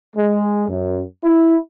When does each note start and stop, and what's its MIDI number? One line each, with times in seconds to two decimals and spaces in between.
0.16 0.65 56
0.69 1.02 42
1.24 1.56 64